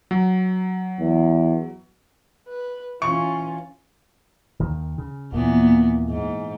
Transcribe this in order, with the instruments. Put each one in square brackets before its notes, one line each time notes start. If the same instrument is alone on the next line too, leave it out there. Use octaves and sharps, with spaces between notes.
[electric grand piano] F#3
[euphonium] E2
[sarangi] B4
[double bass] E3 C#4 [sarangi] F4 [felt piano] C#6
[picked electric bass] D#2 D#3
C#3
[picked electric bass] D#2 A#3 [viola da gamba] A#2 E3 B3
[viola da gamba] G#2